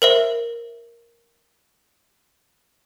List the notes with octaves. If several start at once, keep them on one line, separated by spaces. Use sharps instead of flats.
A#4 C5 E5